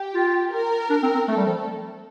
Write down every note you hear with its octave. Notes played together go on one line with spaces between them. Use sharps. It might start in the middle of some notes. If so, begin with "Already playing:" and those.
Already playing: G4
F4
A#4
D4
C4
C4
A3 A4
G3
F3